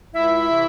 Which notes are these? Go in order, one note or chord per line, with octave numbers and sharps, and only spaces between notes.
C#2 E4 E5
C3 E3